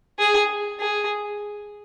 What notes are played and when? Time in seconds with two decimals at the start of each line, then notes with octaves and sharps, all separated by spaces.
0.19 G#4
0.79 G#4